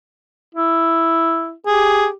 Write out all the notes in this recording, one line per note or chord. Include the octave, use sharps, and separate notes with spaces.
E4
G4 G#4